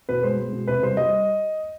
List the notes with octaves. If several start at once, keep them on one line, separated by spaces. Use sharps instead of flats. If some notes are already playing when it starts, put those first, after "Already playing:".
B2 B4
G#3 C5
G#3
B2
C3 B4
G3 C5
G3 D#5